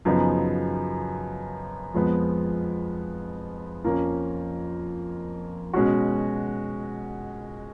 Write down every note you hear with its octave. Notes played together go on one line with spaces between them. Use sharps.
F#2 C#3 F3 B3 D#4
F2 F3 G#3 B3
F2 F3 A#3 C#4
B2 G#3 C#4 F#4